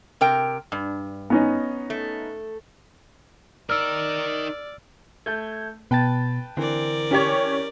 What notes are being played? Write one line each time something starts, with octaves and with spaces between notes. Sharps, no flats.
C3 A#4 G5
G2
B3 C#4 D#4
A3
D#4 A#4 D5 E6 F6
A3 A5 G6 G#6
B2 B4 G5 A5 A6
D3 E3 C4 A#4 D5
C#4 G4 C#5